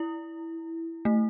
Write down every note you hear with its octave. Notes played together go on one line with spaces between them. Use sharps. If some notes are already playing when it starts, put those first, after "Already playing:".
Already playing: E4
A3